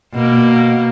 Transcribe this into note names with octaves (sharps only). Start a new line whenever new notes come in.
B2 A#3